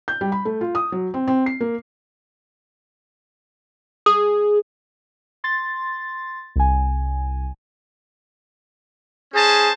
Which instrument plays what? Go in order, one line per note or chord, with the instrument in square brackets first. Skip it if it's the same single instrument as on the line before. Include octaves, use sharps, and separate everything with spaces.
[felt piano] G6
G3
B5
A3
F4
D#6
F#3
C4
C4
C7
A#3
[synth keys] G#4 [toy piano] D#6
[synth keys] C6 A6
C2 G#5
[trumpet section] C#4 C5 A5 [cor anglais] G#4